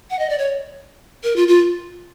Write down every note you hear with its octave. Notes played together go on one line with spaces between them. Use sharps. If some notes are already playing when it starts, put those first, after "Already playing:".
F#5
D#5
D5
C#5
A#4
F4
F4